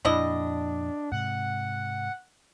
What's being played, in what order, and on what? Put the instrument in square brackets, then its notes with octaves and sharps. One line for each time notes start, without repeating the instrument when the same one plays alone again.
[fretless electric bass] F2 A#2 [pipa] G3 E4 D#5 [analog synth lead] D4
[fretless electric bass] G#2 C3 [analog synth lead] F#5